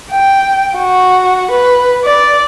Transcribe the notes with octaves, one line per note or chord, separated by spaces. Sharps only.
G5
F#4
B4
D5